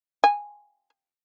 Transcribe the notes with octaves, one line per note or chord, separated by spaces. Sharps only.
G#5